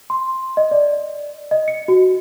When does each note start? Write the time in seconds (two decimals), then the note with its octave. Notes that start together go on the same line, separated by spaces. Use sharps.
0.10 C6
0.57 D#5
0.71 D5
1.51 D#5
1.68 C#7
1.88 F#4